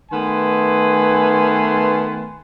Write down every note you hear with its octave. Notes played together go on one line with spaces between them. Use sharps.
D#3 A3 B3 B4 G#5 C6